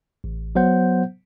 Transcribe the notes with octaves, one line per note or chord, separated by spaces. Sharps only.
A1
F#3 B3 C5 F#5 G6